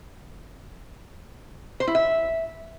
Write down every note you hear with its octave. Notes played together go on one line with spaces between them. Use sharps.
C5
E4
E5